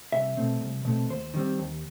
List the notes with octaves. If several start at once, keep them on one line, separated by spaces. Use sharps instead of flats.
C2 E5
B2 A3 C4
C2
B2 A3 C4
D#2 C5
D#3 G3 C4
D#2